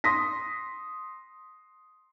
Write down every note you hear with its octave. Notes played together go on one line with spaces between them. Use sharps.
C6 D#6 A#6 B6